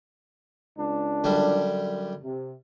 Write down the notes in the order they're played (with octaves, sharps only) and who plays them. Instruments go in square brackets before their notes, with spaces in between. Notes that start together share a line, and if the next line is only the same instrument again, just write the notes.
[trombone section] C#2 D4
[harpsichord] F#2 D3 G3
[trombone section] C3